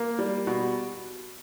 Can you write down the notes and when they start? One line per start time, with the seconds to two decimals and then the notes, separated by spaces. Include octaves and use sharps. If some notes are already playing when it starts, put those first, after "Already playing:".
Already playing: A#3
0.19 G3
0.47 B2